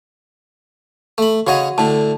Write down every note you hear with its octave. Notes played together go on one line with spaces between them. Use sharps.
A3 B5
C#3 F#4 C#5 D#5 F#5
A2 D3 A5